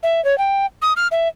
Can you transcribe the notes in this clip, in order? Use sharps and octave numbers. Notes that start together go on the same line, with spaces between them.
E5
C#5
G5
D#6
F6
E5